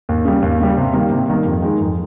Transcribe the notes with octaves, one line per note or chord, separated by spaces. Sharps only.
D#2
C#3 G3
D#2
C#3 G3
C3
D#3 G3 A#3
C3
D#3 G3 A#3
F2
D#3 G#3 D#4
F2